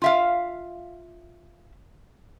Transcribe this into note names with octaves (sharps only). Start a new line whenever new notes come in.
F4 E5 F5